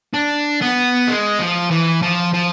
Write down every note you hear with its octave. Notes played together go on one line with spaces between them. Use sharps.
D4
B3
G#3
F3
E3
F3
F3